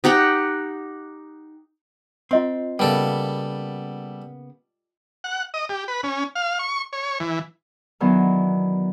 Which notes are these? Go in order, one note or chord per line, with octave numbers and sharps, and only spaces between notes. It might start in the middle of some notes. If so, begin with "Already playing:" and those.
D#4 G4 F#5 G5
C4 F4 D#5 C6
C#3 G3 A#3 B3 A4
F#5
D#5
G4
B4
C#4
F5
C#6
C#5
E3
D#3 E3 F#3 B3 D4